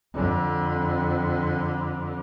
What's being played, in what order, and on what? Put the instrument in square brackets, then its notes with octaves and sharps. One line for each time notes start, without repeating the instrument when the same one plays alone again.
[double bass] F2 D3